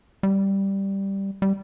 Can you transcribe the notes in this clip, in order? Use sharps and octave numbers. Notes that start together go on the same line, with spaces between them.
G3
G3